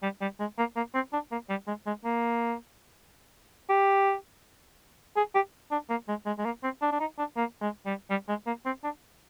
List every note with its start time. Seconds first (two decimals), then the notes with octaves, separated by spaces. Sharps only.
0.03 G3
0.21 G3
0.40 G#3
0.58 A#3
0.76 A#3
0.94 C4
1.13 D4
1.32 A#3
1.50 G3
1.67 G#3
1.86 G#3
2.05 A#3
3.70 G4
5.17 G#4
5.35 G4
5.71 D4
5.90 A#3
6.08 G#3
6.26 G#3
6.38 G#3
6.45 A#3
6.63 C4
6.82 D4
6.92 D4
7.00 D#4
7.18 D4
7.37 A#3
7.61 G#3
7.86 G3
8.10 G3
8.28 G#3
8.47 A#3
8.65 C4
8.84 D4